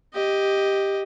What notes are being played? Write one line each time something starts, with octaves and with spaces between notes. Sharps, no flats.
G4 D#5